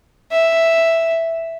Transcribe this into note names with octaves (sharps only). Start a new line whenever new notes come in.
E5